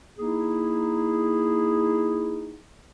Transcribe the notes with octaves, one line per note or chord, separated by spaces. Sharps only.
A#3 D#4 E4 G#4